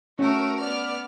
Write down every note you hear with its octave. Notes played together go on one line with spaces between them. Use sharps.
A3 C#4 F#4 A#4
B3 D5 F6